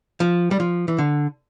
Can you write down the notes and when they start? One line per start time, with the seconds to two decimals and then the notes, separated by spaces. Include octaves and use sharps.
0.20 F3
0.51 G3
0.60 F3
0.88 E3
0.98 D3